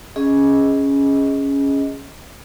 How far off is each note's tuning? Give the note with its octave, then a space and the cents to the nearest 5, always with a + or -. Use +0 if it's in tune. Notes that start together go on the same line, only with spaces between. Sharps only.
C#4 +0 G#4 +0 D#5 +15